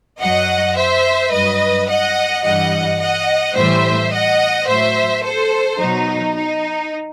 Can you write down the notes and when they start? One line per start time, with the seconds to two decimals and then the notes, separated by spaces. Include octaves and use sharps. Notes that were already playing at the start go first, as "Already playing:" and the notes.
0.20 F#2 F#3 D#5 F#5
0.76 C5 E5
1.32 G2 F#3 B4 D#5
1.88 D#5 F#5
2.44 G2 E3 G3 D#5 F#5
2.99 D#5 F#5
3.55 A2 E3 G3 C5 E5
4.11 D#5 F#5
4.67 A2 F#3 C5 E5
5.23 A4 C5
5.79 B2 F#3 D#4
6.35 D#4